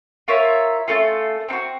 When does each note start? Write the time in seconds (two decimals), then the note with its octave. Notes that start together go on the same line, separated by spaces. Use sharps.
0.28 F4 A#4 C#5 E5
0.88 A3 C#4 F4 A4
1.48 C4 D#4
1.53 F#4